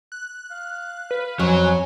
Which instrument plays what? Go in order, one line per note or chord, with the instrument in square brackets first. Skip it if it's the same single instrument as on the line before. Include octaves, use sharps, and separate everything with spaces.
[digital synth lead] F#6
[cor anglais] F5
[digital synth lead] B4
[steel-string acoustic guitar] F2 [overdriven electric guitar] F#3 [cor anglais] C#5 [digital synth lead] G#5